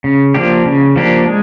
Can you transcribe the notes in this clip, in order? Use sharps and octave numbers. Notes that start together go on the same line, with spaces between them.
C#3
F3 A#3 D4 G4
C#3
F3 A#3 D4 G4
G#3